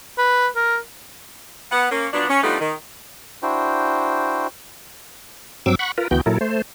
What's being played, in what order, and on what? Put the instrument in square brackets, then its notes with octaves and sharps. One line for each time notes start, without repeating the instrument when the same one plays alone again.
[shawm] B4
A#4
[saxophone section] B3 F#5
A#3 C#4
F3 F#3 B3 D4
C#4
F3 G3 A3 B3 D4 D#4
D#3
[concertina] D4 E4 F#4 C5 G5
[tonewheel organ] G2 F#3 C4 D6 E6
F#5 B5 C#6
F4 A#4 B4
D2 E3 B3 F#4 G5 G6
A#2 F#3 E4 A4 A#4
A3 C5